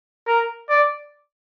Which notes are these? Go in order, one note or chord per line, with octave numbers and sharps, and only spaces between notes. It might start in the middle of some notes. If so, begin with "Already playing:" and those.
A#4
D5